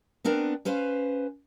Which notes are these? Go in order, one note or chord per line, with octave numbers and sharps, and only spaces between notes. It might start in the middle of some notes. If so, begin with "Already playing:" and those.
B3 C4 D4 A#4
C#4 B4 C5 F5